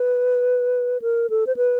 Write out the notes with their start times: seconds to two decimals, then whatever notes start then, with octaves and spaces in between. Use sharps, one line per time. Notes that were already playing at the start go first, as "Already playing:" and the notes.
Already playing: B4
1.02 A#4
1.30 A4
1.47 C5
1.57 B4